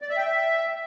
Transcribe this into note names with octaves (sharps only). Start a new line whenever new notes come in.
D5
E5
G5
E5